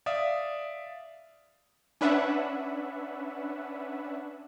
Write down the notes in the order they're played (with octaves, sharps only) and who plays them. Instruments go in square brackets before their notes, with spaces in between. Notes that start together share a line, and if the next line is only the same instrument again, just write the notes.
[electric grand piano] D5 E5 F5 D#6
[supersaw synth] C#4 D4 B4 E5 F#5